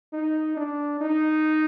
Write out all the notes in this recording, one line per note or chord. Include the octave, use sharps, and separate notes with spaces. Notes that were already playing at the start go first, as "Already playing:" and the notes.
D#4
D4
D#4